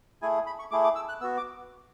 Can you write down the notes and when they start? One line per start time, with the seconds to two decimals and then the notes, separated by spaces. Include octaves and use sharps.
0.22 A3 E4 G#4 G#5
0.46 B5
0.59 C#6
0.71 A3 E4 G#4 D6
0.84 D6
0.95 E6
1.09 F#6
1.21 B3 E6
1.24 F#4
1.37 D6